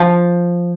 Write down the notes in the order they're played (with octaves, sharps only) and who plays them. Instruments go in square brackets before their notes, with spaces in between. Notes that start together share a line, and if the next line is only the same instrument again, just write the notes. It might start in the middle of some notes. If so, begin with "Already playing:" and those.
Already playing: [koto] F3